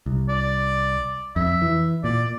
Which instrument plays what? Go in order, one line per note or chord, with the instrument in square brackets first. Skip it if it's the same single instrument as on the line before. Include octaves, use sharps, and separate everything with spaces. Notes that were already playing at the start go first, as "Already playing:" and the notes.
[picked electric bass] C2
[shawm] D5
[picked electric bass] F2 [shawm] E5
[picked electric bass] E3
[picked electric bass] A#2 [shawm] D5